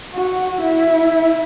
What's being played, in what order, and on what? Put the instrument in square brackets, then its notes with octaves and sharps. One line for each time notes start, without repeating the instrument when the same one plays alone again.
[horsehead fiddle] F#4
E4